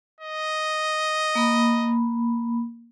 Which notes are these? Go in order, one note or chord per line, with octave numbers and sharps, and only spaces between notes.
D#5
A#3 B5